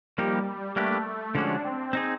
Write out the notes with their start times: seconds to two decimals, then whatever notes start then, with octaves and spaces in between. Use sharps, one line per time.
0.18 F3 G3 A#3 D#4 G4
0.76 G3 A3 A#3 D4 G4 B4
1.35 D3 F3 G#3 C#4 D4 F#4
1.64 C4
1.93 C4 D#4 G#4